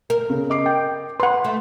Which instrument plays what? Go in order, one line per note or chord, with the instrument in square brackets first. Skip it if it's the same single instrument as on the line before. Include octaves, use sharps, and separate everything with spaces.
[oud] A#4
[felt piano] C#3
D#5 D6 C7
[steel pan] G5
[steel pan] B4 F#5 [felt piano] B5 C6
[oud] A3